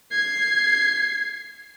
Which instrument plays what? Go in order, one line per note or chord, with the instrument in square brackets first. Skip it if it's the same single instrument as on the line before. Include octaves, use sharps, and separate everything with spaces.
[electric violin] G#6 C7